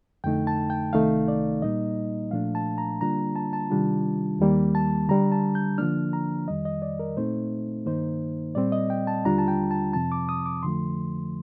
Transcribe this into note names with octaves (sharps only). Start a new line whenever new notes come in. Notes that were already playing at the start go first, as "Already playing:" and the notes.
F2 D3 A3 D#4 G5
A5
G5
C2 C3 D#3 A3 D#4 F5
D5
A#2 G3 A#3 D#4 D#5
A#2 F3 A3 D4 F5
A5
A#5
D3 G3 A#3 D4 F4 A#5
A5
A5
C3 D#3 G3 D4 F4
D#2 D#3 G3 A#3
A5
D3 G3 D4 A#5
A5
G6
D3 F3 A#3 D4 F6
A#5
F2 D#3 G3 D#5
D#5
D5
A#4
A#2 A3 C4 D#4 C5
G2 D#3 A#3 D#4 C5
A#2 G3 C4 D5
D#5
G5
A5
D#2 D3 G3 D4 F4 A#5
A5
G5
A5
F2 C3 F3 C4 A5
D6
D#6
D6
F2 D3 F3 A3 C6